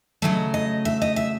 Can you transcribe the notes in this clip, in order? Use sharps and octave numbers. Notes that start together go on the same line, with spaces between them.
C#3 F#3 A3 D#5
D#5
E5
D#5
E5